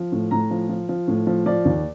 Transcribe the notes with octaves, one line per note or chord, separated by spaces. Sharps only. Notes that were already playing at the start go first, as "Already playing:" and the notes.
Already playing: F3
A2
A2 A#5
F3
F3
F3
A2
F3
F3 D5
D#2